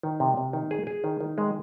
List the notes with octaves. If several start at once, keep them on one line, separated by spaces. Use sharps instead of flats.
D#3
C3
C3
D#3
G#4
G#4
D#3
D#3
G#3